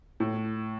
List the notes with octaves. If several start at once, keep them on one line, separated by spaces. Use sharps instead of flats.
A2